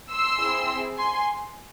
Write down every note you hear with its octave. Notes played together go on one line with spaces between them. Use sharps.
C6 E6
C4 E4 G#4
G#5 C6